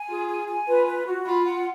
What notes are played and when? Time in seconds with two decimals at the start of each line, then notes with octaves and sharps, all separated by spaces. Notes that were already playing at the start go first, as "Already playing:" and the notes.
Already playing: G#5
0.09 F4 G#4
0.29 G#5
0.48 G#5
0.67 F4 B4
0.86 B4
1.06 F#4
1.26 F4 B5
1.45 F#5